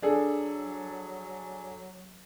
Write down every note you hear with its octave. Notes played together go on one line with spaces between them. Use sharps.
F#3 D4 G#4 A4